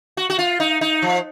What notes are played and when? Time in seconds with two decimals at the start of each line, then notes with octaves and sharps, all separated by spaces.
0.17 F#4
0.30 F#4
0.39 F4
0.60 D#4
0.81 D#4
1.02 F3